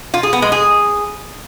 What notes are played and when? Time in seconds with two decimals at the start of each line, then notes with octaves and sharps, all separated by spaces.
0.14 F4
0.23 G#4
0.33 B3
0.42 G#3
0.52 G#4